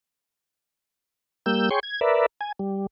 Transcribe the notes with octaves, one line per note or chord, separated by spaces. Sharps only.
G3 A#3 E6 G6
G#4 C#5 G5 C6 C#6
G#6
A#4 B4 D5 E5
G#5
G3